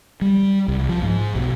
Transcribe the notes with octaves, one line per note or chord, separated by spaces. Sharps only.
G3
C2
F3
G#2
B1